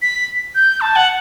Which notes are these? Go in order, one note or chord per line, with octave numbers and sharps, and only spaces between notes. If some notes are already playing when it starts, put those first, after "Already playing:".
B6
G6
A5
F#5